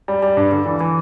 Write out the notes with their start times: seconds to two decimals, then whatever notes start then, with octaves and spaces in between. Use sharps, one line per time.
0.08 G3
0.22 G3
0.37 G2
0.52 D3
0.66 E3
0.80 E3